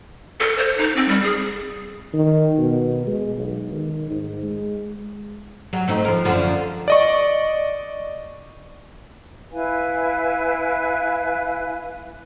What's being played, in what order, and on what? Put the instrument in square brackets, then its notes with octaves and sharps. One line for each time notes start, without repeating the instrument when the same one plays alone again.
[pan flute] A4
C5
D#4
C4
G3
G#4
[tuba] D#3
B2
G#3
B1
D#3
G#2
G#3
[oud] F#3
A3 C4 D#4
F3 A#4
F#2 D3 F3
[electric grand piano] D5 D#5 C#6
[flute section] E4 B4 F5 G#5